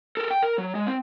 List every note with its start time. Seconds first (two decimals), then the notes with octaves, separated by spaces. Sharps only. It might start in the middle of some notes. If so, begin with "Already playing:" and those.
0.17 A4 A#4
0.30 G5
0.43 A#4
0.58 F#3
0.75 G#3
0.87 C4